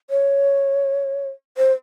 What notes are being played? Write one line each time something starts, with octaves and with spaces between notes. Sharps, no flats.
C#5
C5